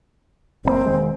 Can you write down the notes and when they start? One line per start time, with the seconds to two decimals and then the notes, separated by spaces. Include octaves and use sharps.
0.65 F#1 C#3 A#3 C4
0.86 E1 D#3 G#3